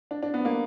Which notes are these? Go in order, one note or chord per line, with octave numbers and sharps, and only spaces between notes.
D4
D4
B3
A#3